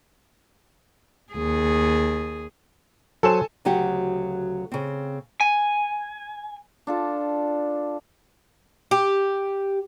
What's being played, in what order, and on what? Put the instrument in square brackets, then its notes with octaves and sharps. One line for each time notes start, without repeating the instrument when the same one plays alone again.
[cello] D#2 G#4
[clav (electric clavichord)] F#3 C5 [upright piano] A4 G#5 E7
[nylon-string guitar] D2 C#3 F#3 G4 F#5
C#3 C4
[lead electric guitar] G#5
[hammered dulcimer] D4 F4 A4
[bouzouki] G4